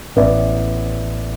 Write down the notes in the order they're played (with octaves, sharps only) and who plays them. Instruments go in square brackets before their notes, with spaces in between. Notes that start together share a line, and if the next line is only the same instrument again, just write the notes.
[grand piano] A1 B3 E4 D5